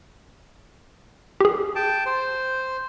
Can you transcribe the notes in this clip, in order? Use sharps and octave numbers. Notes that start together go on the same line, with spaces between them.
G4 G#4
G5 A5
C5